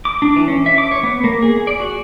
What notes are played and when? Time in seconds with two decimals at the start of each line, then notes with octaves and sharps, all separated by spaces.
0.05 D6
0.22 D4
0.36 E3
0.48 C#4
0.66 E5
0.78 D6
0.91 C#5
1.03 B3
1.24 A#3
1.42 G#4
1.67 D5
1.80 F#4